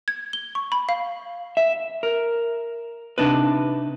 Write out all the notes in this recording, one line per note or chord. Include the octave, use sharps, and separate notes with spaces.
G#6
G7
C#6
B5
F5
E5
A#4
C3 D4 D#4 B4